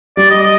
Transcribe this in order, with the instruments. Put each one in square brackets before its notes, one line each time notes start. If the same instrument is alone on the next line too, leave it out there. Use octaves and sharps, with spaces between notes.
[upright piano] G3 [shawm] D5
[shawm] D#5
D#5